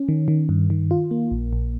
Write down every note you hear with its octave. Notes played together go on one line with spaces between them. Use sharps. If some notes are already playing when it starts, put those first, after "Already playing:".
Already playing: C#4
D#3
D#3
G2
D#3
F4
A#3
A#1
A#1